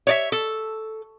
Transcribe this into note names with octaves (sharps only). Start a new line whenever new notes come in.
C#5 D5 E5
A4